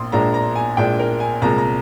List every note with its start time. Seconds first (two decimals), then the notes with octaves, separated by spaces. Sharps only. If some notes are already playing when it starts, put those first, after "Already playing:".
Already playing: A#1 A#2 C6
0.12 A#1 A#2 G#3 D4 A#5
0.34 A#5
0.56 G#5
0.77 A#1 A#2 G#3 D4 G5
0.99 A#4
1.20 G#5
1.42 C2 A#2 G#3 A#5
1.58 A#5